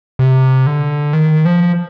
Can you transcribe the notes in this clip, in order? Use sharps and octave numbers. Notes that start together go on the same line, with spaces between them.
C3
D3
D#3
F3